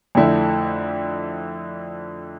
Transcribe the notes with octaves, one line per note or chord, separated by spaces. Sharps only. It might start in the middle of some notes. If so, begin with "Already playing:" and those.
F2 D3 A3 E4